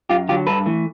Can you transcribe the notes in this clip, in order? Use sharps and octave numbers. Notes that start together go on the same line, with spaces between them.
F#2 F4 G4
D3 F#3 F4 G4
G2 A4 B4
E3 A3